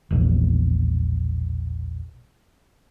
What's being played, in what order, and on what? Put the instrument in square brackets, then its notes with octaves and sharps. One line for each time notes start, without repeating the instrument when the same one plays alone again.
[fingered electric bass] E1 A#1